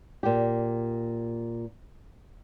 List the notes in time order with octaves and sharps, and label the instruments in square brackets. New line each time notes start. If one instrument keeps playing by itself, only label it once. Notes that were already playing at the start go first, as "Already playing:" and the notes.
[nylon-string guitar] A#2 G4